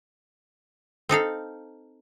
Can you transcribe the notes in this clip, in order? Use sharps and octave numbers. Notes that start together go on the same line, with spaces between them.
C4 D#4 A4 F5